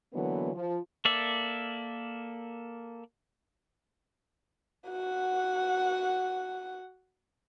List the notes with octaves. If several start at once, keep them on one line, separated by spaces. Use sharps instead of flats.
D3 E3 F#3 A#3 B3
F3
A#3 A4 D5 E5
F#4 F#5